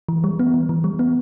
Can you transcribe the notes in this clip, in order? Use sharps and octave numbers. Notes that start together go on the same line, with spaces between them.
E3
G3
B3
E3
E3
G3
B3